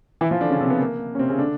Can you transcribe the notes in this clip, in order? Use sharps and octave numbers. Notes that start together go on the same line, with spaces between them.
E3 E4
F3 F4
D3 D4
C#3 C#4
C3 C4
B3
A#3
C#4
C3 C4
C#3 C#4
D3 D4